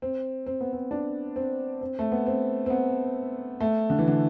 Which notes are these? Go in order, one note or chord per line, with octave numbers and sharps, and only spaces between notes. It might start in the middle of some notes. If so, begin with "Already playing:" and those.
C4
C4
B3
C4
D4
C4
C4
A3
B3
C4
C4
B3
A3
D3
E3
D3